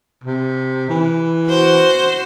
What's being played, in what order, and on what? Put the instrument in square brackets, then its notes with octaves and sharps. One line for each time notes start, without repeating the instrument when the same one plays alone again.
[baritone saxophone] C3
E3
[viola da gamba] F#4 C5